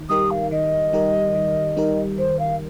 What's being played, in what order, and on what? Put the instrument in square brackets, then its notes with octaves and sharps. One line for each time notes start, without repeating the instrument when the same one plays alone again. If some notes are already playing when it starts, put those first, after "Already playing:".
Already playing: [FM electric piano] D#3
[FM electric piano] G3 D#4 G4 A#4 [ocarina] D#6
[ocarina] F5
[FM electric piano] D#3 [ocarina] D#5
[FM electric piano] G3 D#4 G4 A#4
D#3
G3 D#4 G4 A#4
[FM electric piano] D#3 [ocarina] C5
[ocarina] F5